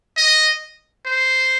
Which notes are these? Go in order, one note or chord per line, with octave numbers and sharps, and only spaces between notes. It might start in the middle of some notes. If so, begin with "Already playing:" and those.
D#5
C5